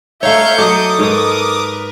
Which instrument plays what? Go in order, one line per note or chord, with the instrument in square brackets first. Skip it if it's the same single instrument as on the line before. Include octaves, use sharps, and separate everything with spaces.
[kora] A3 D#4 [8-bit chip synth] C#5 F5 [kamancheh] E5 [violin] G6 C#7
[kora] F#3 A3 D#4 [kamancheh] A4 [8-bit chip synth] D6 D#6
[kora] G#2 C#5 [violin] A#4 B4